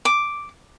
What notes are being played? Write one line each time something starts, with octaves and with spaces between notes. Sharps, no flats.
D6